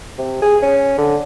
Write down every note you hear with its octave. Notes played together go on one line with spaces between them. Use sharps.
C3
G#4
C#4
D3